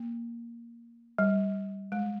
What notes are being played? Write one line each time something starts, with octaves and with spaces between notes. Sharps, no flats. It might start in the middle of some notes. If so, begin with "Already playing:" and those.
Already playing: A#3
G3
G#3